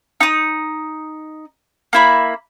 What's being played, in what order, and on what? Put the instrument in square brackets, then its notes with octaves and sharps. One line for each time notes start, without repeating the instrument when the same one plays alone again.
[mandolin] D#4 D#6
A#3 E4 B5